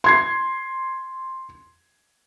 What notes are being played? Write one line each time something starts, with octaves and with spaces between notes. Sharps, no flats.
C6 G#6 C7